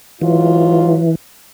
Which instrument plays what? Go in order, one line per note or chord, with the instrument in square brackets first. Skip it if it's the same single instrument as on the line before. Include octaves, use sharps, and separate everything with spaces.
[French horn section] G#2 F#3 F4 [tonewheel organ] E3